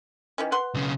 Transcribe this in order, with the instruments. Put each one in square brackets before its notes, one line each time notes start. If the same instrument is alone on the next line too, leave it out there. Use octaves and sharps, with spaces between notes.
[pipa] D#3 E3 C#4
B4 F#5 C6
[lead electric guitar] B1 C#3